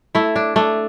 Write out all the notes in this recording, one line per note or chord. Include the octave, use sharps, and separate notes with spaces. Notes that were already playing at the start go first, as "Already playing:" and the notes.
A3 E4
D4
A3 D4